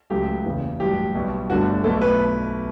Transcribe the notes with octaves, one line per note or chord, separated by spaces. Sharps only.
C#2 C#3 F#3 A3 G4
F#1 E2 C#3
A1 G2 F#3 G4
B1 B2 G3
G1 G2 D3 A3 F#4
B1 B2 A3 A4
B4